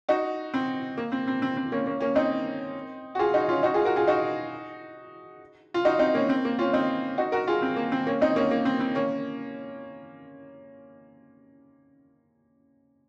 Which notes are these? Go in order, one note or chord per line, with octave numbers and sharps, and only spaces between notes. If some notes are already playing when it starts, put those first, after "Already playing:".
D#4 F#4
C4
A#3
C4
C4
C4
C4
A#3 C#4
A#3 C#4
A#3 C#4
C4 D#4
F#4
F4 G#4
D#4 F#4
C#4 F4
D#4 F#4
F4 G#4
F#4 A#4
F4 G#4
D#4 F#4
F4
D#4 F#4
C4 D#4
A#3 C#4
C4
A#3
C#4 F4
C4 D#4
D#4 F#4
F#4 A#4
F4 G#4
C4
A#3
C4
A#3 C#4
C4 D#4
A#3 C#4
A#3
C4
C4
A#3 C#4